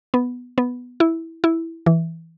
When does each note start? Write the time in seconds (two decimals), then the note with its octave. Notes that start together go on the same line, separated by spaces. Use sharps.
0.14 B3
0.58 B3
1.00 E4
1.44 E4
1.86 E3